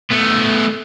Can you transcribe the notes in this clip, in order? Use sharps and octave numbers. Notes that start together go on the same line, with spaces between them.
A3 B3